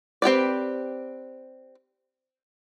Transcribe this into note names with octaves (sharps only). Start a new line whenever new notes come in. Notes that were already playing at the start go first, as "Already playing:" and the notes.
C4 G4 B4 D5